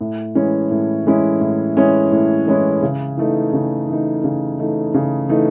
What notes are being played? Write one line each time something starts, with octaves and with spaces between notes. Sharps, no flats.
A2
E3 G#3 C#4 E4
A2
E3 G#3 C#4 E4
A2
E3 G#3 C#4 E4
A2
E3 G#3 C#4 E4
C#3
E3 A3 D#4
C#3
E3 A3 D#4
C#3
E3 A3 D#4
C#3
E3 A3 D#4